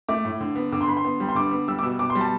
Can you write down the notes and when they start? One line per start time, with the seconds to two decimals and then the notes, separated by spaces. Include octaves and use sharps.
0.09 A3 D6
0.25 A2
0.41 D3
0.56 B3
0.72 D3 D6
0.81 C6
0.87 D3 B5
0.97 C6
1.04 B3
1.20 G3
1.29 C6
1.35 D3 D6
1.51 B3
1.68 G3 E6
1.79 D6
1.83 B2 E6
1.99 B2 D6
2.10 C6
2.15 G3
2.21 A5